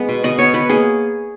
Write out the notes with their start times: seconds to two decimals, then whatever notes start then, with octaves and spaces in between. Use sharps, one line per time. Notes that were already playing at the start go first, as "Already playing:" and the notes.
Already playing: G#3 B3
0.09 B2
0.24 B2 D#5
0.38 B3 C#5
0.54 B3 B4
0.69 A#3 G#4